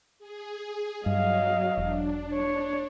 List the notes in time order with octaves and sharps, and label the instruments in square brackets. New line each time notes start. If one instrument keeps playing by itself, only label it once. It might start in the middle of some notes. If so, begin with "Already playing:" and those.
[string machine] G#4
[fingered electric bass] G2 [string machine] F#3 [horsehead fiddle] D#5 F5
[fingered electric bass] E1 [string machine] D4
[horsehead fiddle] C#5